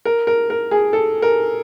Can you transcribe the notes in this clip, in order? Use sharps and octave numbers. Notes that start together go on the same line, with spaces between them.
A#4
A#4
A#4
G#4
A4
A#4